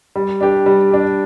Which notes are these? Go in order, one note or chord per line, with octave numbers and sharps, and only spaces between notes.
G3
D4 G4
G3
D4 G4